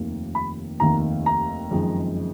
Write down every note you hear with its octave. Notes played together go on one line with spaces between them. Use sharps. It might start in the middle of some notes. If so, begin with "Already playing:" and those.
Already playing: F1 D#2 D#3 A#3
B5
F1 D#2 D#3 A#3 A#5
A#5
F#1 F2 D#3 G#3